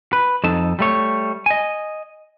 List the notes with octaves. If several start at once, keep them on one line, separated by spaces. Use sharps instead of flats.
B4
F2 D#4 A4 A5
G3 A3 C#5
D#5 G#5